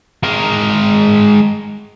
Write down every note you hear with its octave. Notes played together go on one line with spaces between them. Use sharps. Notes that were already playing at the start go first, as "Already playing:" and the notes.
G#3 A#4